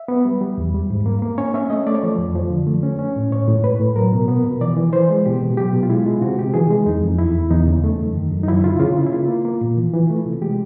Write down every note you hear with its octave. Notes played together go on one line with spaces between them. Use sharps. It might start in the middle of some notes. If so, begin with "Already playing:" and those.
Already playing: E5
B3
G3
G3
E2
G3
G#2
A#3
A#3
C#4 C#5
C#4 E5
A3 D#5
A3 D5
C#5
F3 D5
F2
F3
D3
A3
C#4
C#4
A2
A2 C#5
A2
A2 B4
A2
F#3 A#4
B2
B3
B2
E3 D5
E3
E3 C5
G#3
B2 G4
B2
F#3 G4
B2
F4
G#3 E4
G#3 F4
C3 F#4
C3 G4
E3 G#4
G#3
F2 D#4
F2
E2 E4
E2
E2 D#4
C#3
A3
F#2
D#3
F#2
D#4
F#3 E4
C#3 F4
E4
C#3 F4
C#3 E4
E4
A#3 F4
A#3
A#3
A#2
E3
E3
A3
C3
G#3 G4